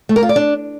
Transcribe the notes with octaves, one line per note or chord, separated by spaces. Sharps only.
A3
A#4
F4
D5
D4